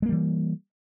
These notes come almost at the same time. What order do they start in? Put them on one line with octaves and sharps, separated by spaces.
G#3 A#3 G3 E3